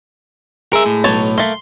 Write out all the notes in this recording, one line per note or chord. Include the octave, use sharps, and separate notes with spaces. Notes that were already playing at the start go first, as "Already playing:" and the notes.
G#3 A#4 E5
A2
B1 D#4 C#5 A5
A3 A#3 C6